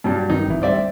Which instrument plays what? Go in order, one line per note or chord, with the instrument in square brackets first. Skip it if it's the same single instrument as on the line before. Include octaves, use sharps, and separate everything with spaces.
[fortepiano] G2 F#3 G3
[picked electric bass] G2 D#3 [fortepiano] D#4
[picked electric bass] G#1 E3
[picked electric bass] D2 G3 [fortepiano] C5 D5 E5